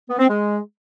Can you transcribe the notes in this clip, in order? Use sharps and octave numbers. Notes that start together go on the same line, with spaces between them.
B3
C4
G#3